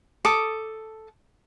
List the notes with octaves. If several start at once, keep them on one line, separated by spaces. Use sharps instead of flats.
A4 D6 D#6